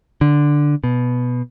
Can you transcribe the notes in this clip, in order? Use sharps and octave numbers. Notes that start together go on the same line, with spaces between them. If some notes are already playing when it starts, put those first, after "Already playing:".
D3
B2